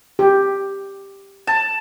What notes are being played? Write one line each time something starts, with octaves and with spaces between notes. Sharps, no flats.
G4
A5